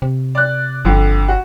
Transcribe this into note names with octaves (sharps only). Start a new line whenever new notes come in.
C3
D5 F#6
G1 F2 D3
F#4